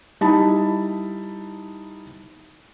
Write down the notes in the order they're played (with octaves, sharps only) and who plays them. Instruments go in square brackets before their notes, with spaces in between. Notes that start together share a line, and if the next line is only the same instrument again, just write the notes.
[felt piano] G3 D#4 E4 A5 B5